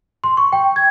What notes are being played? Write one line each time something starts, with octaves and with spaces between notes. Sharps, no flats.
C6
C#6
G5
G#6